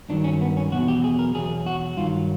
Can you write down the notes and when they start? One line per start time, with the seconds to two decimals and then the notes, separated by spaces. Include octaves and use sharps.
0.09 G2 D#3 F#3 D4
0.24 C#4
0.41 B3
0.57 C#4
0.72 E2 B2 F#3 F#4
0.88 G4
1.04 G#4
1.19 A#4
1.35 E2 B2 F#3 G#4
1.66 F#4
1.97 G2 D#3 F#3 F4